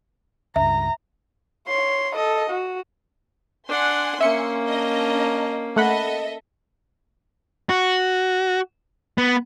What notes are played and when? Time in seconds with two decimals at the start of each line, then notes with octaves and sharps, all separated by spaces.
0.56 C#2 G2 E5 A#5
1.68 C#5 C6
2.15 A4 D#5
2.50 F#4
3.69 D4 F#5 G#5 C6
4.21 A#3 C#4 E5 C#7
4.66 D4 D#5 A#5
5.76 A3 A4 D#5 E5 F#5 B5
7.69 F#4
9.18 B3